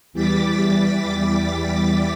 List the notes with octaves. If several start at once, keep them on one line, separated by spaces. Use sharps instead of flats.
E2 E3 G3 D6 A6 B6